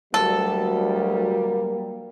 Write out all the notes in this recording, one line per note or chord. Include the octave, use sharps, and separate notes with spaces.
D2 F#3 G3 A#3 A4